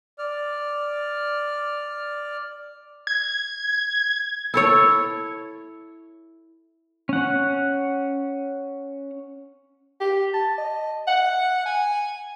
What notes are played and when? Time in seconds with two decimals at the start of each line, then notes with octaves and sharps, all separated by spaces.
0.19 D5 F6
3.07 G#6
4.54 E4 A4 C#5
7.09 C#4 F#5
10.01 G4
10.34 A5
10.58 D#5
11.08 F#5
11.66 G#5